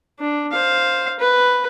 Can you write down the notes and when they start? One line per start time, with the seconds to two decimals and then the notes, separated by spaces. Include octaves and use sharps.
0.20 D4
0.52 C5 F5
1.20 B4